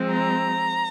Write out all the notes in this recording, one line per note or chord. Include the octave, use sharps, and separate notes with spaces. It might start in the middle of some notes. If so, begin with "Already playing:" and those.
Already playing: F3 G#3 C4
A#5